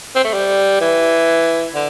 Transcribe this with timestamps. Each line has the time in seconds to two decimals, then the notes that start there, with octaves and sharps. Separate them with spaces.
0.16 C4
0.24 A3
0.33 G3
0.81 E3
1.74 D3